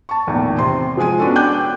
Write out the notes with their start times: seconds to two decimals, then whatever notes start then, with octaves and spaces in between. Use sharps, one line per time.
0.09 A5 C#6
0.27 A#1 E2 A2 D#3
0.58 C3 C6
0.97 F3 G#3 G#4 G#5 D#7
1.20 B3 C#4 D4 F#4 A4
1.35 G5 D6 F#6 G6